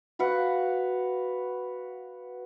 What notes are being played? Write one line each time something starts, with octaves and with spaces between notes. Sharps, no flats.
F#4 B4 F5 F#5